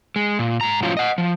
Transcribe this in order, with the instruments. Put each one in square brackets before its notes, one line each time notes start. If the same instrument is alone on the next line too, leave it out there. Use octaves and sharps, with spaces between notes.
[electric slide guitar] G#3
A#2
G#2 A#5
A2 F3 F#3 C#4 F4
D#5 F#5
F3